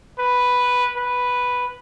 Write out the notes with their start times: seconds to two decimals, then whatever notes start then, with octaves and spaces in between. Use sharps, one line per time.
0.19 B4
0.97 B4